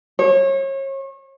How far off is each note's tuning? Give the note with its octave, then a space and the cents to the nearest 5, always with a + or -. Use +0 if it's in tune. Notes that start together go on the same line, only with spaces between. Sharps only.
C#5 -35